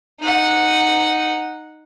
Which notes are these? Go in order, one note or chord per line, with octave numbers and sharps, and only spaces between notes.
D#4 F#5